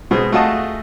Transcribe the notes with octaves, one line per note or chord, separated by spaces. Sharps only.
B2 G#3 C4
A3 F4 F#4 G#4 D#5 A5